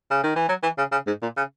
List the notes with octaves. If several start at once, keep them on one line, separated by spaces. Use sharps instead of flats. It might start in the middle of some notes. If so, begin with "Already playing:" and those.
C#3
D#3
E3
F#3
E3
C#3
C#3
G#2
A#2
C#3